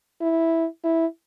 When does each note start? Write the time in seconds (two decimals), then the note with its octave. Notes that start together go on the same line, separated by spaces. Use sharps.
0.21 E4
0.84 E4